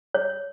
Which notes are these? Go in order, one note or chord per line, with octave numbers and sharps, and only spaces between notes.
C#5